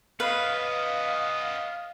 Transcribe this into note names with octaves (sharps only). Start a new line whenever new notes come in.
B3 C#4 B4 D#5 F5